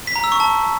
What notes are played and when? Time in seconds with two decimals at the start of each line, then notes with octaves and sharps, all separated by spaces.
0.07 B6
0.16 A#5
0.24 E6
0.32 C#6
0.40 A5